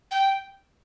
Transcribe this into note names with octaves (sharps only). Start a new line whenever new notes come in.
G5